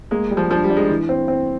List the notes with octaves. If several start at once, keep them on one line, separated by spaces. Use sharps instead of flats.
G#3 A#3
G3
F3
F3 D4
G3
D4
G#3
E3
C4
C4